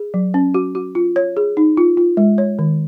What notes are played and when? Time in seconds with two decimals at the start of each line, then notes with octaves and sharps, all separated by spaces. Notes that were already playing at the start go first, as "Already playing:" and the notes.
Already playing: G#4
0.14 F#3
0.34 C#4
0.54 F#4
0.75 F#4
0.95 F4
1.16 C#5
1.37 G#4
1.57 D#4
1.77 F4
1.97 F4
2.17 G#3
2.38 C#5
2.59 D#3